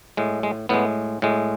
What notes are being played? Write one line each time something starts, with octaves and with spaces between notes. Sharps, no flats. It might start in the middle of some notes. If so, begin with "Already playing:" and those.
A2 G#3
G#3
A2 G#3 B3
A2 G#3